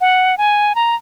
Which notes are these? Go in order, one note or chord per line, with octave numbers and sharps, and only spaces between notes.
F#5
G#5
A#5